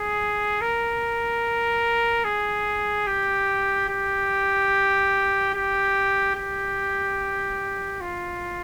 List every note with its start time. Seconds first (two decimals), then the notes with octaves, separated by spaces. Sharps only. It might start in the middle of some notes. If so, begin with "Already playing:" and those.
Already playing: G#4
0.61 A#4
2.25 G#4
3.07 G4
3.89 G4
5.54 G4
6.36 G4
8.01 F4